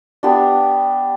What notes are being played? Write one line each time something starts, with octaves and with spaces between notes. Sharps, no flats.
B3 D4 G4